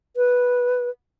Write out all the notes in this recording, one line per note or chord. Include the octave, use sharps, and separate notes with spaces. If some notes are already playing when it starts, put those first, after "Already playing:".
B4